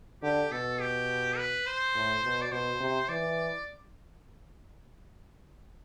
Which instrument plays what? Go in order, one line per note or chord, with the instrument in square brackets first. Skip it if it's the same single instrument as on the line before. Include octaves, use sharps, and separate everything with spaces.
[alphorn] D3 [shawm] G4
[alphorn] B2 [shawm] A4
[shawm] G4
B4
C5
[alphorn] A2
B2
[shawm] D5
[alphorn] B2 [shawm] C5
[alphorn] C3
[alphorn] E3 [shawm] D5